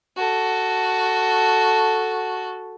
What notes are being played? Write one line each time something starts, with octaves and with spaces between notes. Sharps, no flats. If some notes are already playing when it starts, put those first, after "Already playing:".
F#4 A4